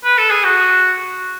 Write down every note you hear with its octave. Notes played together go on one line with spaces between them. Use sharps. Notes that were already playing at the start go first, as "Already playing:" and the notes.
B4
A4
G#4
F#4